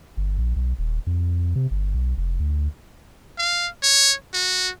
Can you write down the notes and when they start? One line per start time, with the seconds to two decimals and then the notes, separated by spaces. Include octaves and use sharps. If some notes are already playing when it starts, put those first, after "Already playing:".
0.17 G1
0.38 A#1
0.56 B1
0.79 D#1
1.07 F2
1.56 C3
1.71 G1
1.94 B1
2.17 F1
2.40 D2
3.38 F5
3.83 C#5
4.34 F#4